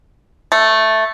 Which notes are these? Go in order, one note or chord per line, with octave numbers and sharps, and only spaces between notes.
A3